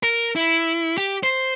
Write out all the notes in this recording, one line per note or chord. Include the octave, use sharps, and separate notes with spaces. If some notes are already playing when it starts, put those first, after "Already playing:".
A#4
E4
G4
C5